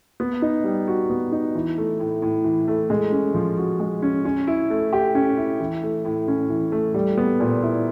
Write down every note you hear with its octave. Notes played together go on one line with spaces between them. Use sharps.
B3
D#4
G3
F#4
B3
D#4
E3
A3
A2
A2
E3
A3
G#3
C#4
F3
F#4
G#3
C#4
C#4
E4
A3
G4
C#4
E4
E3
A3
A2
C#4
E3
A3
G3
B3
A#2
E4